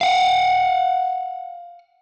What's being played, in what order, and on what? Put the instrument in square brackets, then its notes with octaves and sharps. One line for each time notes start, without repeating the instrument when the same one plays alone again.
[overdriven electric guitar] F5 F#5